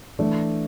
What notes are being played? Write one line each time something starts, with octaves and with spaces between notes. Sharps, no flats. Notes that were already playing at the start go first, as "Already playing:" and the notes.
E3 A3 D4